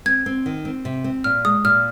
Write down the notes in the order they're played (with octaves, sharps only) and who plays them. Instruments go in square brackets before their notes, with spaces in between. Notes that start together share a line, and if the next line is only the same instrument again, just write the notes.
[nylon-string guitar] C4 [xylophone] G#6
[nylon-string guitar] C4
D#3
C4
C3
C4
[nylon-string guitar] A#2 [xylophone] F6
[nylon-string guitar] G#3 [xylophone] D#6
[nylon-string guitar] A#2 [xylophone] F6